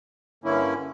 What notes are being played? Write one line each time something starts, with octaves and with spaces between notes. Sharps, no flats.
G2 D3 A#3 C#4 E4